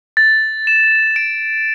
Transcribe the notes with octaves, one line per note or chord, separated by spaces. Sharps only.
A6
E7
D7